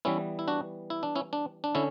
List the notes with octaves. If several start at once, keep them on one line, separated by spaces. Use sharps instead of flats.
E3 G3 B3 C#4 E4
E4
D4 F#4
E4
D4
C#4 E4
D4
D4
D3 C#4 E4